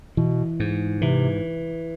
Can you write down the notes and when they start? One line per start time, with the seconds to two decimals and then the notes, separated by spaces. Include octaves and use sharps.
0.17 B2 E3
0.60 G#2
1.02 C3 E3